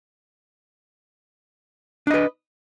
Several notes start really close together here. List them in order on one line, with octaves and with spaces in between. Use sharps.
D4 D#5 B4